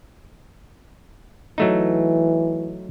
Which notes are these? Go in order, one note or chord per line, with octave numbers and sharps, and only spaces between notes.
E3 F#3 A3 D#4